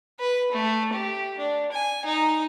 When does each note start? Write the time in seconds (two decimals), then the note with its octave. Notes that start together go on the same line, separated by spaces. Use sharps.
0.20 B4
0.52 A3
0.93 G4
1.39 D4
1.72 G#5
2.05 D#4